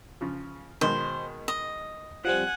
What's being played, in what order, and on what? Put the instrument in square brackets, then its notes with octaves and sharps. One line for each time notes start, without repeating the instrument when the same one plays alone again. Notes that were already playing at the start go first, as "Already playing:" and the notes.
[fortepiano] C#3 F3
[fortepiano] B2 D#3 G#3 [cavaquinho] C5
[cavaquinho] D#5
[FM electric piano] F3 G3 C4 [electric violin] F#5 G#5